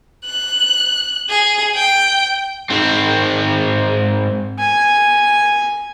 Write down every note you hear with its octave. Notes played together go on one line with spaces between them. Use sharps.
F#6
G#4
G5
G#2 C4
G#5